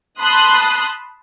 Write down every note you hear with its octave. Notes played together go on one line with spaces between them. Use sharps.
A5 B5 C6 D#6 F#6